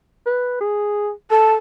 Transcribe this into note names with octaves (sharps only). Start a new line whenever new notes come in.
B4
G#4
A4 A5